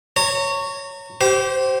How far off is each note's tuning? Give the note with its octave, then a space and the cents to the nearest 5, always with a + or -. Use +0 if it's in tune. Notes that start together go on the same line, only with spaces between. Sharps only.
C#5 +0 A#5 -35
G4 -30 C5 +0